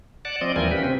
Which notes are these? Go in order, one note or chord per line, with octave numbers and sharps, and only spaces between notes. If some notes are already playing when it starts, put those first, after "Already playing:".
D5 F#5 A5
F3 C4 D5 D#5
D#2 E3 F3 G3 A#4 G#5
C#4 G4 B4
C3 C4